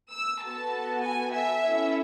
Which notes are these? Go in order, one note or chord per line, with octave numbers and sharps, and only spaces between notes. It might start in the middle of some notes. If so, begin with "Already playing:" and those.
E6
B3 F#4 A4 A5
G#5
E5
C#4 E4 A4